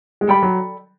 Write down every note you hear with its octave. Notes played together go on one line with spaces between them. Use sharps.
G#3
G3 A4 D5 G5 B5
F#3